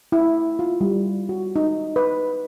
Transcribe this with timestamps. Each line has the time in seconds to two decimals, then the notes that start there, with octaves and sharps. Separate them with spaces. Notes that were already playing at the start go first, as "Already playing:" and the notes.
0.12 E4
0.59 F4
0.81 G3
1.29 F#4
1.56 D#4
1.96 B4